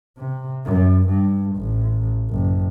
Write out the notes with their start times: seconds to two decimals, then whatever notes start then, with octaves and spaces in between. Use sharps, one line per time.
0.17 C3
0.65 F#2
1.09 G2
1.57 A1
2.30 F#1